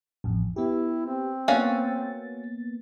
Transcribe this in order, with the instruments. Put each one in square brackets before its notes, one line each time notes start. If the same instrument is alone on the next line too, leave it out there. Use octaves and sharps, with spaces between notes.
[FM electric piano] A1 F2
[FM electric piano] B3 G4 [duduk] E4
[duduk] C4
[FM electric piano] A#3 B3 A6 [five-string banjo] C#4 F#4 F5